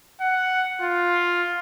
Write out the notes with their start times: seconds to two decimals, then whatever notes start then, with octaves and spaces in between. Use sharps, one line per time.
0.21 F#5
0.82 F4